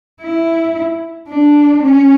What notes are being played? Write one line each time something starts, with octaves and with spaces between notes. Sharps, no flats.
E4
D4
C#4